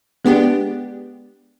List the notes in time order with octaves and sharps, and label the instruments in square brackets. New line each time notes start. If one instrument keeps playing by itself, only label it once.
[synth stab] G#3 B3 D4 G4